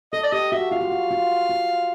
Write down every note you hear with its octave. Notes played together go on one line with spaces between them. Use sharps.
A4 D#5
D5
G4 D#5
F#4 E5
F4 F5
F#4
F4
F4
F4